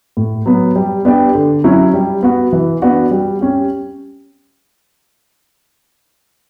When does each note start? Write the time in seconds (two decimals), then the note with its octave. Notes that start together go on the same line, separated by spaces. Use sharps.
0.17 A2
0.46 F#3 B3
0.76 G3
1.05 B3 D4 G4
1.35 D3
1.64 F#3 C#4 E4
1.94 G3
2.23 B3 F#4
2.53 E3
2.82 B3 D4 F#4
3.11 G3
3.41 C#4 G4